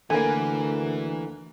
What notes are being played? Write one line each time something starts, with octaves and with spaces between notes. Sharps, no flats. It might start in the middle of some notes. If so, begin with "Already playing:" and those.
D2 D3 E3 A#3 G#5 B5